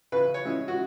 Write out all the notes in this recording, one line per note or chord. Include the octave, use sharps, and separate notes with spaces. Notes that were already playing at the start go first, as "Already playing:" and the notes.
C#3 B4
C#5
G#3 C#4 E4
F#4